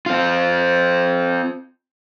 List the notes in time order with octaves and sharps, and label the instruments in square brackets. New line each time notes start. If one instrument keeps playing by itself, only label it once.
[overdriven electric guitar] C4 F4